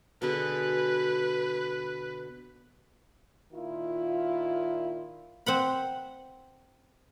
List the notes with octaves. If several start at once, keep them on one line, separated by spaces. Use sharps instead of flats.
B2 D3 G#4 B4
A#2 D#3 E4 F4
C4 F#5 B5